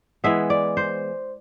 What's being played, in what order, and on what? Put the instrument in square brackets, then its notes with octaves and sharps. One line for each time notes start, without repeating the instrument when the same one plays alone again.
[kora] E3 G#3 B3 E5
D5
C5